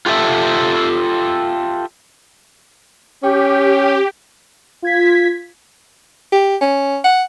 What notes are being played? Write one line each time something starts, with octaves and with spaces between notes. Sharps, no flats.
F4 G4 A4 E5
C#4 G4
F4 G#6 B6
G4
C#4
F#5